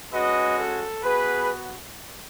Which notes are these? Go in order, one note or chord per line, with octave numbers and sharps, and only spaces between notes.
G#3 C#4 F#4 B4 D#5
A4
B3 F#4 G#4 B4